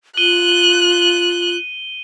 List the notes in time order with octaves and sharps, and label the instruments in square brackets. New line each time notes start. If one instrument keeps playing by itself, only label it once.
[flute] F4 [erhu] F#6 [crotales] D#7 G7